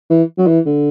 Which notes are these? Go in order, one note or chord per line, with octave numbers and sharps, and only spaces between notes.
E3
F#3
E3
D3